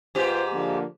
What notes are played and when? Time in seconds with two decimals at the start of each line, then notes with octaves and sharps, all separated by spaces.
0.15 G#2 F4 G4 B4 C5
0.52 D3 F3 A#3